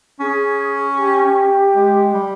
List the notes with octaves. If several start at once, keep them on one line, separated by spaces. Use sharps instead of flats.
C#4 G#4
G4
G#3
G3